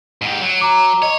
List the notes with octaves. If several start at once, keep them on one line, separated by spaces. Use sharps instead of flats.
G#2 G4
F#3
A#5 D6
C#5 D#5